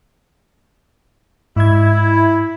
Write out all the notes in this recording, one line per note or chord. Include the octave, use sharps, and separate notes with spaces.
G#2 E4 G#6